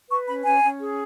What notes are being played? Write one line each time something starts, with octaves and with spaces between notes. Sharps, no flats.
B4 C#6
C#4 B5
C#4 G#5
C#4
G#4